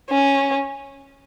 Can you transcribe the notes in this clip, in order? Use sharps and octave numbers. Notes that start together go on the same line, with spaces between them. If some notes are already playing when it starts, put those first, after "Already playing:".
C#4